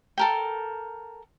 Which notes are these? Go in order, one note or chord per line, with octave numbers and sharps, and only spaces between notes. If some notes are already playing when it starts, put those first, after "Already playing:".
A4 A#4 G5